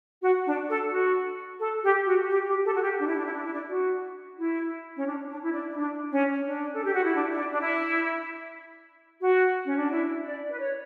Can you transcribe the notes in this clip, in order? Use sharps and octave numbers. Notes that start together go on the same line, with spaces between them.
F#4
D4
A4
F#4
A4
G4
F#4
G4
G4
A4
F#4
G4
D4
E4
D4
E4
D4
E4
D4
F#4
E4
C#4
D4
D4
E4
D4
E4
D4
C#4
D4
A4
G4
F#4
E4
D4
E4
D4
D4
E4
F#4
C#4
D4
E4
D5
B4
C#5